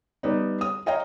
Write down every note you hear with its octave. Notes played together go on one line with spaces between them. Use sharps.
G3 B3 D#4
D#6
C#5 D#5 F5 G5 A#5